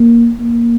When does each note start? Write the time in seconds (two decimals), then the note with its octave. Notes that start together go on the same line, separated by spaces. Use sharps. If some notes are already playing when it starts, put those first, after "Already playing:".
Already playing: A#3
0.40 A#3